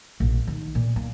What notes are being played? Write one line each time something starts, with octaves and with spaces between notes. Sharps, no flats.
A#1
D#3
A#2
A#3